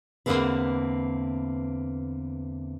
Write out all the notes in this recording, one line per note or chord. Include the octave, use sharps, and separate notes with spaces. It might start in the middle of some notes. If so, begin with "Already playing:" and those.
E2 G2 D3 A#3 C4 B4